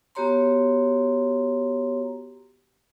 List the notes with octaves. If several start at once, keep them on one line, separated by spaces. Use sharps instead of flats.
B3 F#4 G4 C#5 A#5 C6